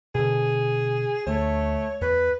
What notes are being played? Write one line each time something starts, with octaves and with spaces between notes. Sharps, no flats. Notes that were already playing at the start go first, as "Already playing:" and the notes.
B2 D3 G#4
D2 A3 C#5
E2 B4